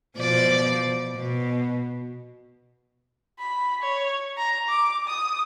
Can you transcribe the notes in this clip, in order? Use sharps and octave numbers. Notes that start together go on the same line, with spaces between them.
B2 F3 D5
B2
B5
C#5
A#5
D6
D#6